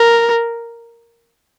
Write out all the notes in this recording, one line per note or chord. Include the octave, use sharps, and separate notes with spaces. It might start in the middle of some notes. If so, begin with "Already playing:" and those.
Already playing: A#4